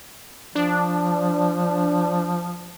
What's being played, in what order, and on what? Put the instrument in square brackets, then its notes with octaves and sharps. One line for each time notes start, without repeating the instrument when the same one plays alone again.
[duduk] F3 [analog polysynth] D4